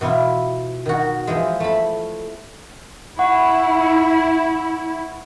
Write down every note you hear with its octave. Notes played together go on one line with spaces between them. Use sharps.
B2 E3 E4 F4
D#3 F#4
E3 F3 G#3
A3 A5 B5
E4 F#5 C#6